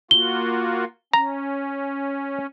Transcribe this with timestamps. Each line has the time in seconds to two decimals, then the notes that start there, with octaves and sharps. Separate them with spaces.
0.11 A#3 F4 F#4 G7
1.13 C#4 A#5